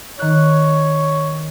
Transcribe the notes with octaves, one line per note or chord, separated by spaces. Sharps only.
D#3 C#5 F#6